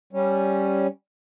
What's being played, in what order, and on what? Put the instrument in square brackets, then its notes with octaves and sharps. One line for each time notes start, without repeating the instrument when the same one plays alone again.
[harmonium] G3 C#4